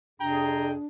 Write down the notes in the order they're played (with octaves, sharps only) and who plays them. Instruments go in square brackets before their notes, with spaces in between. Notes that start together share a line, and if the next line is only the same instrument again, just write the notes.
[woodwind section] F2 C3 G#4 [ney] D4 [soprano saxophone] G5 [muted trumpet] A#5